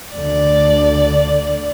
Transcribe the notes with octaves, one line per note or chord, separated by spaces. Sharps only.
D2 D3 D5